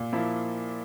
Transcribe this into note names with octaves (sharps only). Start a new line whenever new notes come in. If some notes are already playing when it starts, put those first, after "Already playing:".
Already playing: A#2
F3 A#3 E4